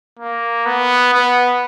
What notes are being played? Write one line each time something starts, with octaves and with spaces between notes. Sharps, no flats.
A#3
B3
B3